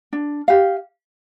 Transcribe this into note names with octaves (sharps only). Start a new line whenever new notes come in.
D4
G4 F5